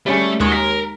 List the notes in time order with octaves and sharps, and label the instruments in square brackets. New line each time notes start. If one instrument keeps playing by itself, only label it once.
[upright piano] G3 C#4 G#4 [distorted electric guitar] A3
[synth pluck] D#2 G#3 [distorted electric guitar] F#4 C#5
[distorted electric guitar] A#4 [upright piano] B6